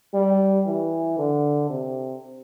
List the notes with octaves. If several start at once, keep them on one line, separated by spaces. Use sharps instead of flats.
G3
E3
D3
C3